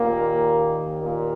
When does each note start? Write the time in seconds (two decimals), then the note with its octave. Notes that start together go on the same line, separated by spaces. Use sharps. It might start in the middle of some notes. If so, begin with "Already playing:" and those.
Already playing: D#2 A#2 D#3 A#3
1.01 A#2 A#3